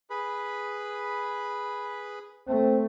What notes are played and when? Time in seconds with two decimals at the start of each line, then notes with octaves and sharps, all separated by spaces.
0.10 G#4 B4 B5
2.48 A3 C4